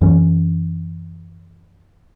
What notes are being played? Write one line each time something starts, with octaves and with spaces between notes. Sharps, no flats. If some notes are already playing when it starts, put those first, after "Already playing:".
F#2 E3 C#4